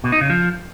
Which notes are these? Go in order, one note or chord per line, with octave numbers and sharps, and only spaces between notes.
B2
D#4
C#3
F3